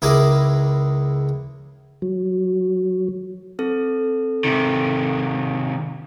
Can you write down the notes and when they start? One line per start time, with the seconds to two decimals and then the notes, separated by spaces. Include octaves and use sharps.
0.02 C#2 E4 G#4 A#4 B5 D6
2.02 F#3
3.59 C4 A4
4.44 C3 D#3